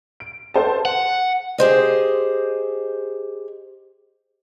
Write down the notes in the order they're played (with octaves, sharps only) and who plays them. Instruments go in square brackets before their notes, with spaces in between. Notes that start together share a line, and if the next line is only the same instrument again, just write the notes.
[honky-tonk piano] D7
A4 B4 C5 A5
[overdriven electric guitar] F#5
[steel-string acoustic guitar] G4 G#4 C5 D#5